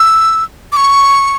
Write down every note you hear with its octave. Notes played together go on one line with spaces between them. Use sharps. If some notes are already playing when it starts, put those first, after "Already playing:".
Already playing: E6
D6
C#6